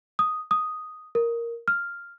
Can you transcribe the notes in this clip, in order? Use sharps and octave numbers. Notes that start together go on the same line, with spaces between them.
D#6
D#6
A#4
F6